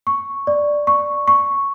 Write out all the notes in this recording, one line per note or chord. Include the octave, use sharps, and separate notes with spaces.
C#6
D5
C#6
C#6